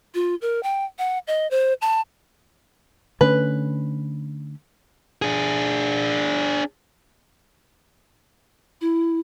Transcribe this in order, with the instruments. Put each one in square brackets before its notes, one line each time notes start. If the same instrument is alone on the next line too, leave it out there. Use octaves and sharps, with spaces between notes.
[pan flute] F4
A#4
G5
F#5
D#5
C5
A5
[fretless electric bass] D3 A3 C#4 [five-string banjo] B4
[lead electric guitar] D4 G#4
[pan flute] E4